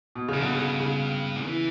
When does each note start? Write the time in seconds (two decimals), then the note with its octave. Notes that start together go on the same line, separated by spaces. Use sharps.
0.15 B2
0.28 F#2 C#3
0.41 G2 B2 D3
0.55 C#3
0.80 C#3
1.45 E3